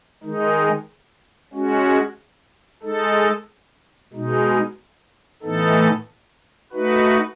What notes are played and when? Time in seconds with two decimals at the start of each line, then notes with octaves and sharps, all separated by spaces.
0.23 D#3 G#3 D#4
1.53 G#3 C#4 F#4
2.83 G#3 D#4 A4
4.13 B2 G#3 D#4
5.43 A2 E3 B3 D#4 A4
6.72 A3 D#4 F#4 B4